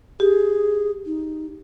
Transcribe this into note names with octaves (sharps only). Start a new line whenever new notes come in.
G4 G#4
D#4